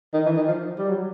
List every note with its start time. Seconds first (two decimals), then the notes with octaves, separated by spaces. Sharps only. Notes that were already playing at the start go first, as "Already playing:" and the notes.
0.13 D#3
0.26 E3
0.36 D#3
0.48 F3
0.78 G3
0.89 F#3